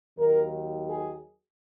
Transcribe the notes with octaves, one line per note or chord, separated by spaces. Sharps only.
D#2 D#3 F#3 A#4
G#4